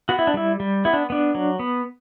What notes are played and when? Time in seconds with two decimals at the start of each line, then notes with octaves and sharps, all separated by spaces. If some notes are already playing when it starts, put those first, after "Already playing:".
0.09 B3 F#4
0.19 E4
0.27 D4
0.34 G3 E4
0.60 G3
0.85 B3 E4
0.93 D4
1.10 B3 D4
1.35 F#3
1.59 B3